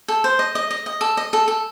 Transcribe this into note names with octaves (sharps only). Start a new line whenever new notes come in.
A4
C5
D#5
D#5
D#5
D#5
A4
D#5
A4
A4